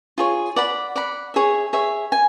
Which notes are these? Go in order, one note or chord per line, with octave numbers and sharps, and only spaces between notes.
F4 G#4 C#5
D5 F#5 B5
D5 F#5 B5
G#4 C#5 E5
G#4 C#5 E5
G#5